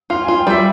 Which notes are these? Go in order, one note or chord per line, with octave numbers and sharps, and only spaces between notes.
F4 F5
G#5
F4
G5
G3 E5